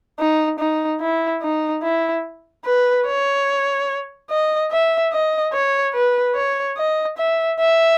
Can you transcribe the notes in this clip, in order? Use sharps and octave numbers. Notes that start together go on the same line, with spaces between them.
D#4
D#4
E4
D#4
E4
B4
C#5
D#5
E5
D#5
C#5
B4
C#5
D#5
E5
E5